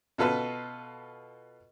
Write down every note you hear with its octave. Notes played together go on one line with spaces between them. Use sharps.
B2 F4 A4 B4 B5